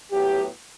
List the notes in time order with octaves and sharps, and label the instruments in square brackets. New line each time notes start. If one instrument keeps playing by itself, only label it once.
[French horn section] A2 F#3 B3 G4